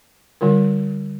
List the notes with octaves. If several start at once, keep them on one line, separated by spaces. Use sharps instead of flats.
D3 G3 F4 A#4